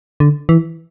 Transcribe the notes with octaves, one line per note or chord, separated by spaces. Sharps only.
D3
E3